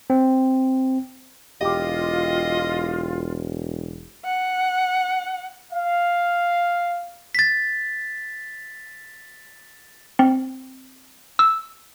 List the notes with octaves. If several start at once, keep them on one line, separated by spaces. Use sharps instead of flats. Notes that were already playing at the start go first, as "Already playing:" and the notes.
C4
E1 F4 G4 D#5 D6
F#5
F5
A6 B6
C4
E6